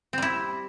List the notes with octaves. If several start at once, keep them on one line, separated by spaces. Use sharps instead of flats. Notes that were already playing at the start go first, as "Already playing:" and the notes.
G3 C4 E4